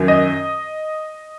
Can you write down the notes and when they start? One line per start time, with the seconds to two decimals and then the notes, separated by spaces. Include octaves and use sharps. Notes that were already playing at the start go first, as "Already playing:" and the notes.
Already playing: F#2 D#3 F#3
0.08 D#5